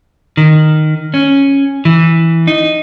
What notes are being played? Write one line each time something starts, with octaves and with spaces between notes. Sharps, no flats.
D#3
C#4
E3
D#4